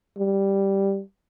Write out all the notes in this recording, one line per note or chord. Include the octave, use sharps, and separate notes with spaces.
G3